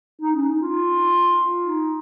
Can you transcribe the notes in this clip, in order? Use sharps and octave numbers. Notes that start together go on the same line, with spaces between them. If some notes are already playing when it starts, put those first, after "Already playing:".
D#4
C#4
D#4
F4
D#4